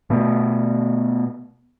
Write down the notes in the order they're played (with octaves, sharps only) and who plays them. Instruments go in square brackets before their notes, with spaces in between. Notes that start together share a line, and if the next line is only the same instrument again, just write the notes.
[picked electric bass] B2 A3 B3